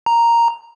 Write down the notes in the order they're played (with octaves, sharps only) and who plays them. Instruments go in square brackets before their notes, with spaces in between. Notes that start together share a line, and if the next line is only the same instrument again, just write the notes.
[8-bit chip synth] A#5